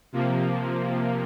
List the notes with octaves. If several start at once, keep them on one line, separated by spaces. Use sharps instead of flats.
C3 F3 A#3